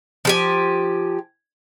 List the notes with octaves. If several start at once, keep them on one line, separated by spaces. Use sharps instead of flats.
F3 G4 G#5